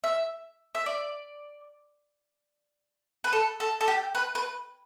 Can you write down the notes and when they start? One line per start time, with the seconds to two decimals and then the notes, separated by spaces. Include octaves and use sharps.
0.04 E5
0.75 E5
0.86 D5
3.24 B4
3.33 A4
3.60 A4
3.81 A4
3.88 G4
4.15 B4
4.35 B4